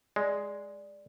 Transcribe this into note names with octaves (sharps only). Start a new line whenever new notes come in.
G#3 D5